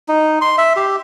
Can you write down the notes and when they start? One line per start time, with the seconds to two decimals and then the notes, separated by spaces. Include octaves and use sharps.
0.08 D#4
0.41 C6
0.58 E5
0.76 G4